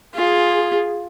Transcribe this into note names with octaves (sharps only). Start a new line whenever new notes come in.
F4 G#4